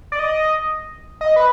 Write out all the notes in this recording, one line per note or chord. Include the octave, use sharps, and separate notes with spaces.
D5
D#5
D#5
B4